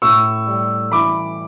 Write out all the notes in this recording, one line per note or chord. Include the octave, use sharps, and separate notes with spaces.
A2 C#6 E6
G3
E3 B5 D6